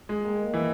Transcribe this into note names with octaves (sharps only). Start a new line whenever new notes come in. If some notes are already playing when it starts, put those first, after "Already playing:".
G#3
D#3 A#3 D#4 G4
E3